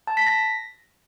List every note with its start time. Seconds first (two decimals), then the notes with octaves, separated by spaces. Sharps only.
0.07 A5
0.17 B6
0.27 A#6